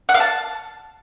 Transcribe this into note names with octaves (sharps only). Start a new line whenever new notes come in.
F#5
F5
A5